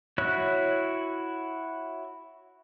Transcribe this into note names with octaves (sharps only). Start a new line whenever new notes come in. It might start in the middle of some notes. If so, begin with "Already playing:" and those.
E4 F#4 C#5 E6 F#6